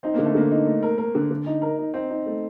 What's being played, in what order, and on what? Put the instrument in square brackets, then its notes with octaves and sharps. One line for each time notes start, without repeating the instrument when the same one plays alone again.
[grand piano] C4 [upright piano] D#4
[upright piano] D3 [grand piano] A#3
[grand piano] A3
[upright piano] D3 [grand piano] A#3
[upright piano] D#4
A3
A#4
A#4
D3
D3
D#4
A#4
D#4
[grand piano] C4 [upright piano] D#4
[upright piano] D#4
A3